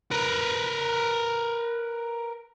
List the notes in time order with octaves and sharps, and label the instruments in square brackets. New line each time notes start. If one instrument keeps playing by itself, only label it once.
[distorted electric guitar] A#4 B4